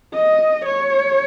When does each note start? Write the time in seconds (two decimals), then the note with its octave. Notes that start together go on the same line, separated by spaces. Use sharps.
0.14 D#5
0.65 C#5